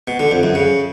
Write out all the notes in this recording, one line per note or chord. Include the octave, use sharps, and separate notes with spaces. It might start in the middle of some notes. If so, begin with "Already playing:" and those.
B2
D3
F2
F#2
C#3